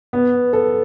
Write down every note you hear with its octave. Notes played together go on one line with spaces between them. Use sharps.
B3
A4